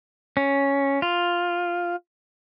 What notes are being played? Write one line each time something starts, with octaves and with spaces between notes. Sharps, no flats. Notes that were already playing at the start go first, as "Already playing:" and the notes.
C#4
F4